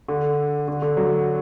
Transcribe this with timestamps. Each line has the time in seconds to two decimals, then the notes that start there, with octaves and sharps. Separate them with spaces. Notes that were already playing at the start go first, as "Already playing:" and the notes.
0.08 D3
0.68 D3
0.82 D3
0.97 F#3